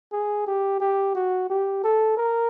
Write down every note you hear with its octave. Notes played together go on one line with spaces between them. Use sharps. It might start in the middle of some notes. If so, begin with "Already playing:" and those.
G#4
G4
G4
F#4
G4
A4
A#4